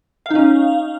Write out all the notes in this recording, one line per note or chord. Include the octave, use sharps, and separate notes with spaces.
C#4 D#4 F5